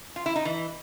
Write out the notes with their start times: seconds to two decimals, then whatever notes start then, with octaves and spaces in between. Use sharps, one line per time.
0.16 F4
0.26 E4
0.36 D#4
0.45 E3